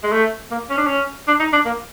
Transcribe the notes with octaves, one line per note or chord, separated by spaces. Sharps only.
G#3
A3
A#3
C#4
D4
C#4
D4
D#4
D4
A#3